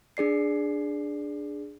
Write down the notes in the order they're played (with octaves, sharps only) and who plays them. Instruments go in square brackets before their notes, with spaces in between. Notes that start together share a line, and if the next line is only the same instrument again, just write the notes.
[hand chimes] D4 G#4 D5 C7